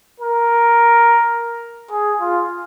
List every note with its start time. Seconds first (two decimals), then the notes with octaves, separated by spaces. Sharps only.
0.20 A#4
1.92 G#4
2.20 F4